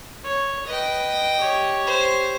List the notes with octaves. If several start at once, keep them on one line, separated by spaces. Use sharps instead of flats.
C#5
B4 D#5 G5
G4 C#5
C5